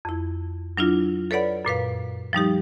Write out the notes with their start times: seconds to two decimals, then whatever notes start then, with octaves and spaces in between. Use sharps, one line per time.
0.05 F2 E4
0.77 F#3 D4 E4 F4
1.31 A4 B4 C#5 D5 F#5 B5
1.65 F#2 A#2 B4 F5
2.33 F3 G3 D#4 G4